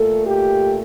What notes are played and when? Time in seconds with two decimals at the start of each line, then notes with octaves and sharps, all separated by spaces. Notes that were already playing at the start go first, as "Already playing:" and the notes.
Already playing: A#2 A3 A4
0.27 G4